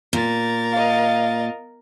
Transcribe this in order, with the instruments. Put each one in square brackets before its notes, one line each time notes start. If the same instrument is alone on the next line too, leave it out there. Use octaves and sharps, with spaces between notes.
[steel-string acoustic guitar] A#2 [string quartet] A#4 A6
[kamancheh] D#5 F5